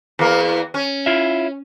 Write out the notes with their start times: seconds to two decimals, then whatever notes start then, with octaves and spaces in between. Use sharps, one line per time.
0.19 E2 A#3
0.74 C#4
1.06 E4 F4 E5